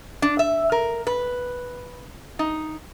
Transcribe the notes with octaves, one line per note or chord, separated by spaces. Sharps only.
D4
E5
A#4
B4
D#4